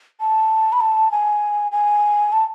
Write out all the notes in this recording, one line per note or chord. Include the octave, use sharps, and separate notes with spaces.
A5
B5
A5
G#5
G#5
A5